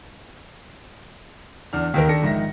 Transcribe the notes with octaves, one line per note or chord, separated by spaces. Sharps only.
E2 D4 F6
D#2 D#3 A#4
D#2 D4 A4 A#6 C#7
A#1 G#2 D#3 E5 A#6